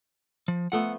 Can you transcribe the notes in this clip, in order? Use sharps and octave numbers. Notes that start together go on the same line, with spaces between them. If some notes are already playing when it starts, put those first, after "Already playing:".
F3
F3 A3 B3 F#5